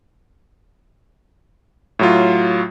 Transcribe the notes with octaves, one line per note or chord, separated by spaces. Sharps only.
A2 F#3 F4